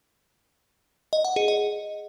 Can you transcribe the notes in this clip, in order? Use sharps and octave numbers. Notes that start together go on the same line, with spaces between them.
D#5
F#5
G#4
D#5